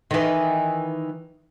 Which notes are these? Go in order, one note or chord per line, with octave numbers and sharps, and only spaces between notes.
D#3 E3